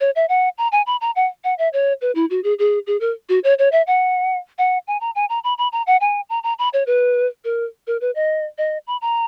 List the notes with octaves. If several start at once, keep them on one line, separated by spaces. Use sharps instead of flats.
C#5
E5
F#5
A#5
G#5
B5
A#5
F#5
F#5
E5
C#5
B4
E4
F#4
G#4
G#4
G#4
A#4
F#4
C#5
C#5
E5
F#5
F#5
G#5
A#5
G#5
A#5
B5
B5
A#5
F#5
G#5
A#5
A#5
B5
C#5
B4
A#4
A#4
B4
D#5
D#5
B5
A#5